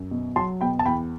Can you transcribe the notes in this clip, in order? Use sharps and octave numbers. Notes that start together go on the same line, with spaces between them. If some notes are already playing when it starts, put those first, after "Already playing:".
Already playing: F#2
B2
F#3 A5 C6
B2 G5 B5
A5
E2 G5 B5